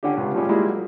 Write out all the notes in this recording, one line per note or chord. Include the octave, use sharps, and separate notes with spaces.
D3 C#4 D4 G4
C#2 C3
F3 G3 G#3 C#4 G4
G3 G#3 A#3 E4 F#4
F#3